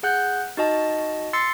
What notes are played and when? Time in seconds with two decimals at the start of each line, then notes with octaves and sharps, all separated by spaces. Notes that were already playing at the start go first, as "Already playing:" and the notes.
0.03 G#4 F#5 F#6 G6
0.57 D#4 F#4 D#5 A5
1.33 C6 E6 A6 C7 C#7